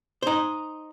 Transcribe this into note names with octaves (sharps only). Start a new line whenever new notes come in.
D#4 C5